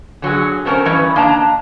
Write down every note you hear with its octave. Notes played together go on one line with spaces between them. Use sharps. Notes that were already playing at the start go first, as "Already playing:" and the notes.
D3 F#3 F#4 G#4
A3 C4 C#4 A4 A#4
G2 E3 C#4 B4 D#5
A#3 D4 D#5 A5 A#5